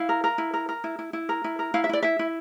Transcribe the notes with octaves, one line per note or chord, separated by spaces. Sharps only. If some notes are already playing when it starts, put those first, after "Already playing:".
Already playing: E4 F5
A#4
A#4
E4
A#4
A#4
E4
E4
E4
A#4
E4
A#4
E4 F5
E5
E4 D5
E4 E5
E4